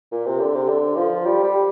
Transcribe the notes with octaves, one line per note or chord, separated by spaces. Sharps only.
A#2
C3
D3
C3
D3
F3
G3
G3